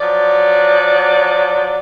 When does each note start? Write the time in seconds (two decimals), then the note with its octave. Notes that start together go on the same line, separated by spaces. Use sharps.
0.01 F3 F#3 D5